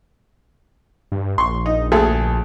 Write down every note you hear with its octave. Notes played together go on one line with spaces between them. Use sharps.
G2
A#1 C6 C#6
D#4
D2 G#4 A4